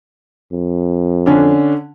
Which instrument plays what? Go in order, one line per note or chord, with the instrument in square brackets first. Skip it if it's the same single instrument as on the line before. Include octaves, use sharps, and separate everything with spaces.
[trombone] F2
[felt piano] D3 C#4 D4